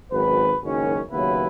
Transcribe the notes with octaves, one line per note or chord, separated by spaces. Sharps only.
G#1 F#2 D#3 B4
F#1 F#2 D#3 G#3 C#4
D#2 C#3 F#3 B3 E4 B4